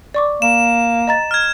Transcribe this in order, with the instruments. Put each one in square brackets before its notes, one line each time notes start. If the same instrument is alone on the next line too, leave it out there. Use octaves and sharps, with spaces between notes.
[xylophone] D5 C#6 D6
[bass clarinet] A#3 [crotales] E7
[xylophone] D#5 A#5 A6
[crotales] F6 G#6